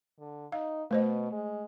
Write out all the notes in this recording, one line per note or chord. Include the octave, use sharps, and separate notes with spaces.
D3
D#4 F5
B2 A3 C5 D#5
G#3